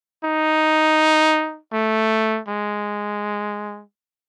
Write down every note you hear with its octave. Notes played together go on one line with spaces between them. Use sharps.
D#4
A3
G#3